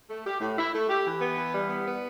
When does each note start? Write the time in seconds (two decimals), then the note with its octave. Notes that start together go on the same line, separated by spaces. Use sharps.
0.09 A3
0.25 G4
0.41 A2
0.58 E4
0.73 A3
0.89 G4
1.05 E3
1.21 B3
1.37 E3
1.53 G3
1.70 B3
1.87 B3